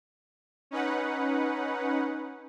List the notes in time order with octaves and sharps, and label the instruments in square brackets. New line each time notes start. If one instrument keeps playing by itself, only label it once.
[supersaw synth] C#4 D#4 B4 F#5